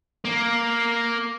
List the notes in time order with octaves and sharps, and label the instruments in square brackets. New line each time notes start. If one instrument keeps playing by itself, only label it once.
[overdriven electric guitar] A#3